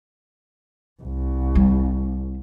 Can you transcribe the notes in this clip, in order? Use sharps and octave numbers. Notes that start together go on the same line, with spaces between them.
C2
G3 C4